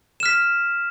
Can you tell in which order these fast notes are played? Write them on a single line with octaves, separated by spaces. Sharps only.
E7 F6 B6